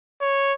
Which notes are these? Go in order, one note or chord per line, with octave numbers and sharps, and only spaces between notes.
C#5